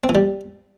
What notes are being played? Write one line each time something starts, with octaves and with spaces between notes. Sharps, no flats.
C4
E3
G3